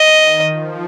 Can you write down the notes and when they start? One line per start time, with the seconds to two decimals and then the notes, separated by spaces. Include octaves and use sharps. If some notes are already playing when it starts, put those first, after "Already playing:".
Already playing: D#5
0.19 D#3
0.48 F3